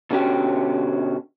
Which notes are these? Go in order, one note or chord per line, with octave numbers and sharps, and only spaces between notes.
B2 D3 C#4 F#4 G4